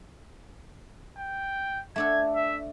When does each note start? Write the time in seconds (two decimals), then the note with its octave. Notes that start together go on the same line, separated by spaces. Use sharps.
1.18 G5
1.96 A3 D4 A4 G#6
2.35 E5